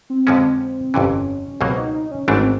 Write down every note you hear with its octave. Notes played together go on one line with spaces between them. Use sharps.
C4
F2 D3 F3 G#3 C#4
G1 F2 C3 E3 C#4
C#2 B2 F#3 A#3 C4
D#4
D#4
C#4
G#1 G#2 E3 A3 C#4 D4
C4